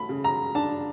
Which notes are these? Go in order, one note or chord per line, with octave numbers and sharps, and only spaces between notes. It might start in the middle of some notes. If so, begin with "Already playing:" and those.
Already playing: A3 B5
C#3
A#5
D4 A5